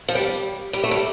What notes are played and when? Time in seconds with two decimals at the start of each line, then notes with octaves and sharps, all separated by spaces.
0.08 F3
0.15 G3
0.73 G3
0.83 A3
0.91 G3